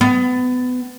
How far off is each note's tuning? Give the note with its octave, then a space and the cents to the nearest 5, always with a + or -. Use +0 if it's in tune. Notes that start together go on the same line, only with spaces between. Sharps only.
B3 +25